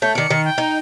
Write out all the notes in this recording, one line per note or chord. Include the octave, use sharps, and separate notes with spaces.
A3 C#5 G6
D#3 D5 C#7
D#3
G5
D#4